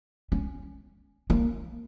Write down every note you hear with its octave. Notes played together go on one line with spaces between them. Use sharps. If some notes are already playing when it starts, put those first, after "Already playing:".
C#4
A#3